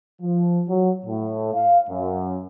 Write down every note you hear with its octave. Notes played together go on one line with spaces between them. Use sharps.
F3
F#3
A2
F5
F#2